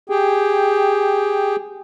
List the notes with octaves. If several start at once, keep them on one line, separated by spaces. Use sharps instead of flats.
G4 G#4 G5